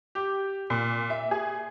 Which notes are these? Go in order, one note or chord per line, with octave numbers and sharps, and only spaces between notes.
G4
A#2
E5
G#4